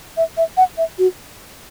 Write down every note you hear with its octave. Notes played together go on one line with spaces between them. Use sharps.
E5
E5
F#5
E5
F#4